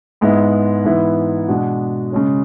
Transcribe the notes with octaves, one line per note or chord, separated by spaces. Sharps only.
G#2 G#3 B3 E4
G#2 E3 B3 E4
B2 G#3 D4
C#3 G#3 C#4